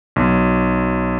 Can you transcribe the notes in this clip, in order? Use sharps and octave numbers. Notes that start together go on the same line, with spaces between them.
B1